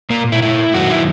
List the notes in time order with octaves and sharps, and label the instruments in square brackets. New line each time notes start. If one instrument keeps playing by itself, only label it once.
[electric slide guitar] A#2 A#3
E4
E4
F#2 D#3 F#4
E4